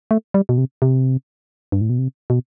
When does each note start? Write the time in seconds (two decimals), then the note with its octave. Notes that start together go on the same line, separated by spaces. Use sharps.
0.11 A3
0.34 G3
0.49 B2
0.58 C3
0.82 C3
1.72 G2
1.81 A2
1.90 B2
1.99 C3
2.30 B2